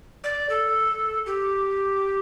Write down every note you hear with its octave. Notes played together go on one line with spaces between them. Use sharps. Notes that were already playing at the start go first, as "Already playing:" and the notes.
D5
A4
G4